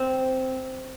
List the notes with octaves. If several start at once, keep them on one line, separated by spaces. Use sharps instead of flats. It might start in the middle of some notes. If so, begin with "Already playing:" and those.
Already playing: C4